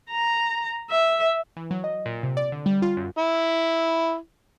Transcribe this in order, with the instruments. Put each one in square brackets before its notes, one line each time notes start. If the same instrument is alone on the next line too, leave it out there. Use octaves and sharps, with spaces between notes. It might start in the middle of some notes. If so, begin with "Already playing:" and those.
[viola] A#5
E5
[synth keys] E3
F#3
D#5
A#2
C3
D5
D3
G3
F4
F#2
[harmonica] E4